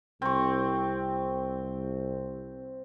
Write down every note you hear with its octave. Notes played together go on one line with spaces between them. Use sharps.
C2 C4 C#6